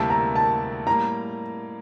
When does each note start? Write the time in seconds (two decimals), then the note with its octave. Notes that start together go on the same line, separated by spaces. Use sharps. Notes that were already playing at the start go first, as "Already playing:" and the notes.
Already playing: D2 C3 G3 A#3 E4 A5
0.10 A#5
0.35 A5
0.87 A2 G3 A#3 A#5